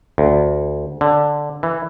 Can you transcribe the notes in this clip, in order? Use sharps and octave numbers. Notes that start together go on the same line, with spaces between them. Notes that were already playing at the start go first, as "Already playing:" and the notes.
D2
D3
E3